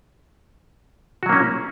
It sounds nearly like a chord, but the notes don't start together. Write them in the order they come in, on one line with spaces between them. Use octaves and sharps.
F#4 F#3 A#3 C#4